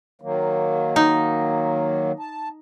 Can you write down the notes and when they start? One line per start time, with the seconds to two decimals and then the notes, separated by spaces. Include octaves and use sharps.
0.21 D#3 F#3 A#3
0.96 D#4
2.19 A5